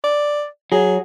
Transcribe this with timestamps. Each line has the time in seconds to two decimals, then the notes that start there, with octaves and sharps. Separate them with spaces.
0.04 D5
0.72 F#3 G#4